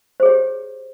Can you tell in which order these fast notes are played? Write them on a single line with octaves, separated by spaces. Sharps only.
C5 G#4 C#5 G4